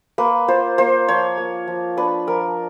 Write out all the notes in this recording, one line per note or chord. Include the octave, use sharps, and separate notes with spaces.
A#3 B4
F4 C5
A#3 C5
F3 C#5
A#3
F3
D4 B4
F3 A#4